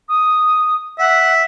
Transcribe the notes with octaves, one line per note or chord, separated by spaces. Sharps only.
D#6
E5 F#5